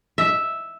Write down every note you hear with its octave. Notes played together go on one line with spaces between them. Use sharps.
E5